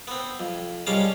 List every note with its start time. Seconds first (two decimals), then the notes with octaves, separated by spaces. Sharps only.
0.07 B3 C4
0.39 F2
0.87 C2 G3 G#3 C#4 F5 A5